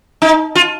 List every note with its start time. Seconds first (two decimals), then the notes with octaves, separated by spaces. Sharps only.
0.22 D#4
0.55 F4